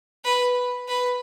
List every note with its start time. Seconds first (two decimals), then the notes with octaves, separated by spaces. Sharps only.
0.24 B4
0.88 B4